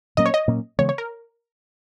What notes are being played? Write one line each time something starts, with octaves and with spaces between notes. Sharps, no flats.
A#2 F#3 A#3 C#4 D#5
C#5
D#5
A#2 F#3 A#3 C#4
C#3 E3 G#3 B3 C#5
C#5
A#4